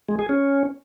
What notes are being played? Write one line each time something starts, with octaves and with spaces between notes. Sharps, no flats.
G#3
G#4
C#4